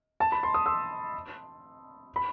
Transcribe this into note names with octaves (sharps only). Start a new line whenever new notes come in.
A5
B5
C6
D#6
C6 E6
B5